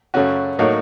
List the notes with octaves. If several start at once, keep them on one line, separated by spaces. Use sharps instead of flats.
F#2 C#3 A3 C#4 F#4
A2 F#3 A#3 D#4 F#4